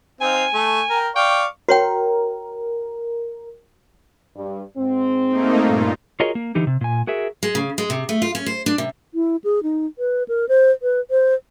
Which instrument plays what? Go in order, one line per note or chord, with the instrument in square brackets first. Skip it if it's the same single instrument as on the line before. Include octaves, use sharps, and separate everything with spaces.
[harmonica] C4 D#4 F5 [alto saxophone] G#5
[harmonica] A3 A4
A#4 G5
[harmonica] D5 F5 C#6 [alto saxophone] G5
[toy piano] F#4 C#5 G5 [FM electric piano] A#4
[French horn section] G2
G#2 C4
[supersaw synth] A3 A#3 D#4
G2 A#2 F4
[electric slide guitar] F4 F#4 G#4 A#4 C#5 D#5
A#3
D3 E3 D#4 G4
C3
A#2 G#5
F#4 G#4 A#4 E5
[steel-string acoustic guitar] G#3
C#3
G#3
C3
A3
F4
C#4
C5
D4
C3
[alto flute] E4
G#4
D#4
B4
A#4
C5
B4
C5